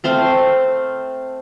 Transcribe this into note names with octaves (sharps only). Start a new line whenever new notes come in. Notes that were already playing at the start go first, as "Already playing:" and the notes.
A3 C4 C5 F5